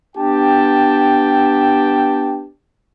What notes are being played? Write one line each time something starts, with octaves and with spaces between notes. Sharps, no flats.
B3 D4 G4 G5 A5